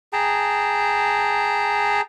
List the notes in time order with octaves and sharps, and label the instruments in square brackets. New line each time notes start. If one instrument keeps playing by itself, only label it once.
[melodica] G#4 G5 A5 A#5